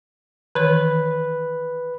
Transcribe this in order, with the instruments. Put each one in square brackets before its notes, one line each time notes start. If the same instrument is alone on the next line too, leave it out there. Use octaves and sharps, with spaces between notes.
[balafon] D#3 E3 C#5 [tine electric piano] B4